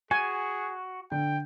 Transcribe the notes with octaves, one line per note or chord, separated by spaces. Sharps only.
F#4 G#4 G#5
D3 G5